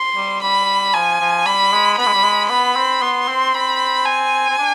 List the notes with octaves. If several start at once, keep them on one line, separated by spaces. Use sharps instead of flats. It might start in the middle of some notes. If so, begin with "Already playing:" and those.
Already playing: C6
G3
G3 B5
F3 G#5
F3
G3 B5
G#3
B3 B5
G#3
G3
G#3
B3 B5
C4
B3 C6
C4
C4 B5
G#5
C4
D4